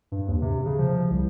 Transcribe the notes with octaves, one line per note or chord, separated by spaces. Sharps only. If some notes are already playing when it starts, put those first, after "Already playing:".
G2
D#2
C3
C#3
F3
C2